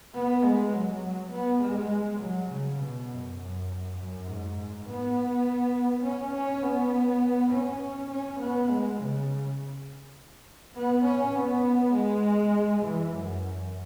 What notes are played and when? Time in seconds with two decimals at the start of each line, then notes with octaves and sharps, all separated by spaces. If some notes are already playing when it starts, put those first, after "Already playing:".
0.15 B3
0.44 G#3
0.73 F#3
1.32 B3
1.62 G#3
2.21 F#3
2.50 C#3
2.80 B2
3.09 F#2
3.39 F#2
3.98 F#2
4.27 G#2
4.86 B3
6.04 C#4
6.34 C#4
6.63 B3
7.52 C#4
8.10 C#4
8.40 B3
8.70 G#3
8.99 C#3
10.76 B3
11.06 C#4
11.36 B3
11.95 G#3
12.83 E3
13.12 F#2